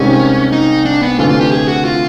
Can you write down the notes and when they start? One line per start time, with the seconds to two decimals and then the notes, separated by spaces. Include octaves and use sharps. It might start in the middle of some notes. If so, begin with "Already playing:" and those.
Already playing: C2 C3 D#3 G#3 C#4
0.52 D#4
0.85 D4
1.01 B3
1.18 D2 C3 E3 A3 D4 F4
1.29 F4
1.41 G4
1.52 G#4
1.68 F#4
1.85 F4